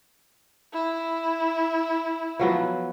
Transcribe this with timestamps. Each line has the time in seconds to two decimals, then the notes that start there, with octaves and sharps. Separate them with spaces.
0.73 E4
2.39 F3 F#3 B3